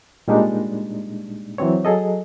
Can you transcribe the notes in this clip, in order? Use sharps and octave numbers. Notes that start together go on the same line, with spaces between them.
A#2 G3 G#3 D4 D#4
E3 F#3 C4 C#5
F#3 G#4 A4 D#5